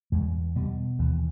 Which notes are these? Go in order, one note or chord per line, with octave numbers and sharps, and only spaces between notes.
E2 G#3
B2 G3
D#2 E3